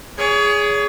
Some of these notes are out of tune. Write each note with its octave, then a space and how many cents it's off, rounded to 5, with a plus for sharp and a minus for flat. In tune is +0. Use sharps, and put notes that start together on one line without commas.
G#4 +0 C#5 +35